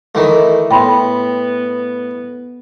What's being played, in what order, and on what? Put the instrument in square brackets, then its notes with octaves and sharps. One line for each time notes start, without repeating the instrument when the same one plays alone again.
[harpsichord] D#3 E3 A3
[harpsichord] A2 [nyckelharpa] B3 [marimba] G5 B5 C6